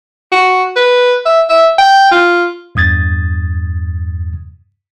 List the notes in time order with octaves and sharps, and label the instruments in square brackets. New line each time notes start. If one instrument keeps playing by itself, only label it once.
[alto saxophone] F#4
B4
E5
E5
G5
F4
[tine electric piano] E2 G2 D#6 G#6 A6